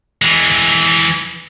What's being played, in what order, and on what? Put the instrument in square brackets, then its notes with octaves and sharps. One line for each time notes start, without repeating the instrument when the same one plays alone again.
[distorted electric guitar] E3 G#3